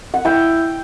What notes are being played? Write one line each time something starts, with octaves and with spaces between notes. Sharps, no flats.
F#5
E4 G5